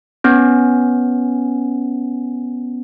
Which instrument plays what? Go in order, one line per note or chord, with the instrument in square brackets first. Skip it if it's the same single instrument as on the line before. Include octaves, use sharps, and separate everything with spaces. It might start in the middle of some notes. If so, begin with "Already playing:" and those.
[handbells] B3 C#4